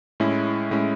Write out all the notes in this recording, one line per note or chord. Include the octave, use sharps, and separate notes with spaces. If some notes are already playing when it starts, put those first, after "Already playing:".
A2 G#3 C#4 E4
A2 G#3 C#4 E4